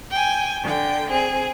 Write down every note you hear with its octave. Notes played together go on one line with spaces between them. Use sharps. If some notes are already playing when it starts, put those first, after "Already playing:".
G5 G#5
D3 G5
C4 G#4